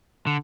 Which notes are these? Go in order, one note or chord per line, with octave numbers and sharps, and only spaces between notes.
D3